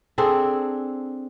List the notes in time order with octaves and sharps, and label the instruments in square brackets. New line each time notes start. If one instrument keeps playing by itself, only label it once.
[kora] C4 D4 G#4 A4